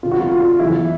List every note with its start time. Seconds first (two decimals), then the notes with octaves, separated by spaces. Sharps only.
0.03 F2 D3 G3 F4
0.12 F#4
0.19 F4
0.32 F4
0.60 F#1 E2 C#3 E3 E4